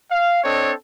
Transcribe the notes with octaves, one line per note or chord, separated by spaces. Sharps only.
F5
C4 D4 A4 C#5 D#5